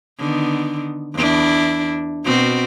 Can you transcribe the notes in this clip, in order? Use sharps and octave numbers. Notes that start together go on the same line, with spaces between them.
D3 D#3 B3
E2 D4 E4
B2 C4 F#4